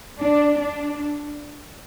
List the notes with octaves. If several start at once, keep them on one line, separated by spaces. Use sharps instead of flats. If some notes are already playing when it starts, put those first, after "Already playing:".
D4
D4